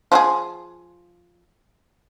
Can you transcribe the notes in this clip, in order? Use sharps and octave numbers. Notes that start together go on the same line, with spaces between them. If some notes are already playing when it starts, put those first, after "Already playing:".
F3 F#4 G#4